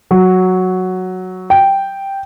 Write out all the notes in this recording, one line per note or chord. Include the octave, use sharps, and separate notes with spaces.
F#3
G5